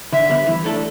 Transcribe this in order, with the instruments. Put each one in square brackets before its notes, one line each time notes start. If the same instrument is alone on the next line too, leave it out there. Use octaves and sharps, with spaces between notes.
[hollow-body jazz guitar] D3 [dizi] E5
[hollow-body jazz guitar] G3 B3
E3
A3 D4 A4